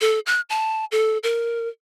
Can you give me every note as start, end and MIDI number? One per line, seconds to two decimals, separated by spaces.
0.01 0.19 69
0.26 0.41 90
0.50 0.85 81
0.92 1.18 69
1.23 1.69 70